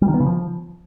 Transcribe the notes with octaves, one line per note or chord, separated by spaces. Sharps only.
G3
D#3
B3
C#3
F3